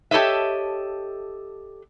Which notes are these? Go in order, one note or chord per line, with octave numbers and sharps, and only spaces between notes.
G4 A4 C#5 D#5 E5